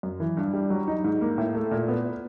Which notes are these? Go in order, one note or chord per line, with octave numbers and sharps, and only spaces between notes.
F#2
E3
G2
G3
F#3
D#4
G#2
A#3
A2
A3
A#2
B3